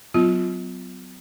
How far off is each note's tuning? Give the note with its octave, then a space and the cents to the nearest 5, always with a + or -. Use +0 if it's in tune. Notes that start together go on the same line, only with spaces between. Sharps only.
F#3 +5 B3 +40 F4 +0